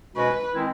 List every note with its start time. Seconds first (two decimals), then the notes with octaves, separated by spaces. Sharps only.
0.15 B2 G#3 C#4 F#4 B4
0.54 D#3 G#3 C4 E4